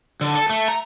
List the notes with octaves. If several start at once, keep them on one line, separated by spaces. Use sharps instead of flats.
D3
A4
A3
A#5